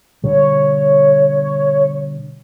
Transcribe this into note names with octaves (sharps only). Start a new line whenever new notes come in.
B2 D3 G3 C#5